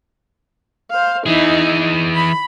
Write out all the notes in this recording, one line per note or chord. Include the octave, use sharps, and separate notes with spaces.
C5 F5
E3 D#4 E4 G#4
B5